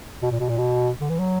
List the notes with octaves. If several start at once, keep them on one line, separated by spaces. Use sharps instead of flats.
B2
A#2
B2
A#2
B2
D3
E3
F#3